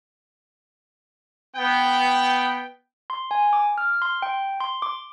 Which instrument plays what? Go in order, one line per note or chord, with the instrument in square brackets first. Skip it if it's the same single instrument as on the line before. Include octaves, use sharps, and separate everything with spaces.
[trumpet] B3 [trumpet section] G5
[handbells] C6
G#5
D6
F6
C6
G5
C6
D6